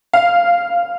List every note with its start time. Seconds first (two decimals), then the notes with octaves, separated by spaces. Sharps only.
0.13 F5